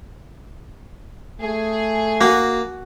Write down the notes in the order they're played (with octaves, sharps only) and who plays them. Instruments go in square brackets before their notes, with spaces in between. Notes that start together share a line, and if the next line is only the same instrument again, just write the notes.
[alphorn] A3 [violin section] G#4
[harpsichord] A#3 [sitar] F#4